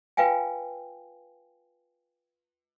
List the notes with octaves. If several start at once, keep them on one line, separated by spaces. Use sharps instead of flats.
F4 B4 F5 G5 G#5